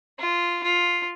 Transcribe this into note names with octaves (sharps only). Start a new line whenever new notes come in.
F4
F4